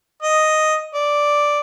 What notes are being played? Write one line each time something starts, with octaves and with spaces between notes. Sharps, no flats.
D#5
D5